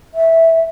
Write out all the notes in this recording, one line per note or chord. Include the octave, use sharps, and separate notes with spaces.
E5